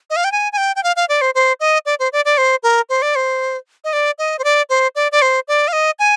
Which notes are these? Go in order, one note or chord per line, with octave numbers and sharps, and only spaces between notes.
D#5
F5
G5
G#5
G#5
G5
G5
F5
F5
D5
C5
C5
D#5
D5
C5
D5
D5
C5
A#4
C5
D5
C5
D#5
D5
D#5
C5
D5
C5
D5
D5
C5
D5
F5
D#5
G#5